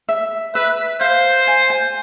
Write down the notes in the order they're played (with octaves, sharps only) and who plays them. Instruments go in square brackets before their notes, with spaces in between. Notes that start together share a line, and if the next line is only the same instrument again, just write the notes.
[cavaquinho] E5
[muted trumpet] B4 [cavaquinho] E5
[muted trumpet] C5 [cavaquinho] F5
[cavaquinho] G#5
G#5